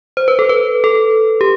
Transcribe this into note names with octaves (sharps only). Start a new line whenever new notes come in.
C5
B4
A4
B4
A4
G4